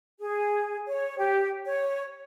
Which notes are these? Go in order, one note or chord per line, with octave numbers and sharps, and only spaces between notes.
G#4
C#5
G4
C#5